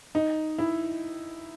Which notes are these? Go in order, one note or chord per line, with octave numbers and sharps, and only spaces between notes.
D#4
E4